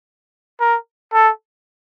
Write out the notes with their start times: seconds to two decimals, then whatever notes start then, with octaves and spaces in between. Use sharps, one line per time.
0.60 A#4
1.14 A4